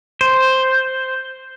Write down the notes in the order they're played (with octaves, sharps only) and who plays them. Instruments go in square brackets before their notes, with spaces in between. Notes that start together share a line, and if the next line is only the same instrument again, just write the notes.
[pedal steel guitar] C5